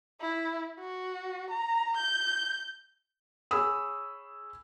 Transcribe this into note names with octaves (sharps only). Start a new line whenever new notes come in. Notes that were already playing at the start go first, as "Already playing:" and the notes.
E4
F#4
A#5
G6
G#4 C#5 G#5 B5 D#6 E6